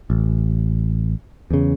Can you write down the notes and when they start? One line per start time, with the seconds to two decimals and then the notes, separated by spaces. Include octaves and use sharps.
0.10 A1
1.51 E2 C#3